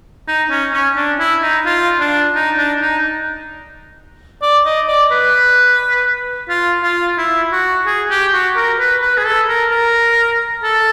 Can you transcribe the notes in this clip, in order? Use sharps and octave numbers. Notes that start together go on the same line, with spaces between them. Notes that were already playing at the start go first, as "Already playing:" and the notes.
D#4
C#4
C#4
D4
E4
D#4
F4
D4
D#4
D4
D#4
D5
D#5
D5
B4
F4
F4
E4
F#4
G#4
G4
F#4
A#4
B4
B4
G#4
A4
A#4
A#4
A4